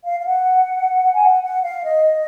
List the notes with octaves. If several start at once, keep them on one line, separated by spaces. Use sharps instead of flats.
F5
F5
F#5
G#5
F#5
F#5
F5
D#5